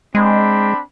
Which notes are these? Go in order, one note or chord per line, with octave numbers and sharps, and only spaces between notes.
G#3 C4 D4 B5